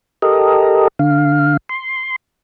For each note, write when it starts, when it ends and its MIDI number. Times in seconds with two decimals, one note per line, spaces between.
0.22 0.88 67
0.22 0.88 69
0.22 0.88 70
0.22 0.88 75
0.99 1.57 50
0.99 1.57 77
1.69 2.16 84